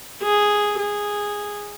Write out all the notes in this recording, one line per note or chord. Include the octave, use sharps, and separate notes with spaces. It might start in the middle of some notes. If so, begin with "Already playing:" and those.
G#4
G#4